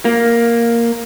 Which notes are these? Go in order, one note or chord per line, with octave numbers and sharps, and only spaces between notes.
A#3